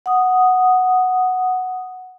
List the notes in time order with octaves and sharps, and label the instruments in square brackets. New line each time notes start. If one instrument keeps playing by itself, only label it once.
[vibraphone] F#5 D#6